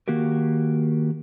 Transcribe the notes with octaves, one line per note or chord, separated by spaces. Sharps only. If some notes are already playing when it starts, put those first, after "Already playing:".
D#3 A#3 F#4 G4 A#4